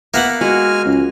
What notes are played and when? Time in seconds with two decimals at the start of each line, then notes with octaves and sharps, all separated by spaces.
0.14 A#3 B3 E5 F#5
0.41 G#3 F#4 G#5 F6
0.85 C#2